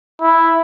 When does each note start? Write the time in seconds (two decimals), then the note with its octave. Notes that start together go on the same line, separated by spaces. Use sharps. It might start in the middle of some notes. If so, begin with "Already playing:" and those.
0.21 E4